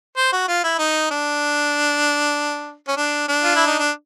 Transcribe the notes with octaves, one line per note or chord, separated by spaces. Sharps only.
C5
F#4
F4
E4
D#4
D4
C#4
D4
D4
F4
E4
D#4
D4